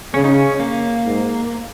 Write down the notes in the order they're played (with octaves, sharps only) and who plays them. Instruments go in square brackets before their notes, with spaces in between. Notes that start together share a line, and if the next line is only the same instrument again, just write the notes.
[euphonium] C#3 [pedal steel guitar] C#4
[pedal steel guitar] D#4
C#4
A#3
[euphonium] G#2